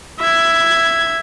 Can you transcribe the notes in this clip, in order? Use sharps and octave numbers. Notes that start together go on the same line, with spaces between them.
E5 G#6